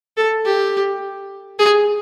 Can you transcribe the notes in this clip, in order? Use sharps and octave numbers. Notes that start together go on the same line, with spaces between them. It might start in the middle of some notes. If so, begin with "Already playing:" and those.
A4
G4
G#4